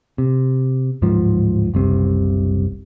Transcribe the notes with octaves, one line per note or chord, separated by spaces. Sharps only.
C3
D1 G#2 F3
F#1 C2 C3